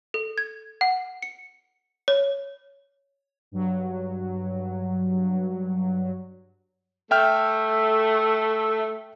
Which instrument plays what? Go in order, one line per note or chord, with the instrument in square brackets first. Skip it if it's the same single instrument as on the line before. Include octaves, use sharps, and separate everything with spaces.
[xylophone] A4
G#6
F#5
C#7
C#5
[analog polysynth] G2 F#3
[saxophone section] A3 [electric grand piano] E5 G5 F6